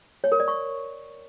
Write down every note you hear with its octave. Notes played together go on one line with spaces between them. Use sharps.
C#5
A#4
D5
C#6